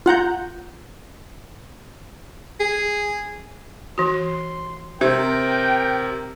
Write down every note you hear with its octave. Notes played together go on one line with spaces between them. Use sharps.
F4 F#5 A#5 G6
G#4
E3 F#4 C6
C3 A#4 C5 E5 G5